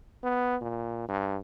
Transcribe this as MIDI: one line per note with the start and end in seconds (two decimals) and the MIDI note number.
0.24 0.57 59
0.62 1.06 46
1.09 1.38 43